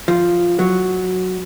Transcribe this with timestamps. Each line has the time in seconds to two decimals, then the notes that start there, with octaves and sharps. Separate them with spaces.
0.08 F3
0.59 F#3